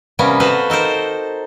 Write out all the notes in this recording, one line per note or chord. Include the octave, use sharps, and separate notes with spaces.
C3 G3 A#3 B3 C#4
F#4 A4 B4 C5 F5
D#4 A4 A#4 C5